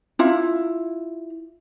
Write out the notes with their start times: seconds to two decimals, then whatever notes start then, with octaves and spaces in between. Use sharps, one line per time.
0.19 E4 F4